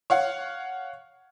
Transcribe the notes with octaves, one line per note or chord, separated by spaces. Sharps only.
C#5 F5 F#5